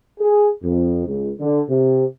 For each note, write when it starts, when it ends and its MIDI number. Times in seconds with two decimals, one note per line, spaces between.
0.20 0.48 68
0.63 1.05 41
1.07 1.30 37
1.40 1.61 50
1.70 2.03 48